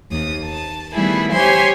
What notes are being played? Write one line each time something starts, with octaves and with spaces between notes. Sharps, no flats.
D#2 D#6
A5
D#3 G3 A3 B3 E4 G#4
G4 C5 C#5 E5 G#5 C6